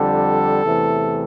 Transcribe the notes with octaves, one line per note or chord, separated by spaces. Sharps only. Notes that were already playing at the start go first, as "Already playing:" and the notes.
Already playing: F2 D3 G3 A4
E2 C3 E3 A3